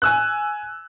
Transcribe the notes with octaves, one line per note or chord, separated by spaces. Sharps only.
G#5 E6 F#6